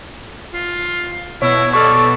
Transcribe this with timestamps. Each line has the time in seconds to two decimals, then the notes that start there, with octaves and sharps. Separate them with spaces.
0.53 F4
1.42 B2 E4 C#5
1.73 A4 D5 C#6 F6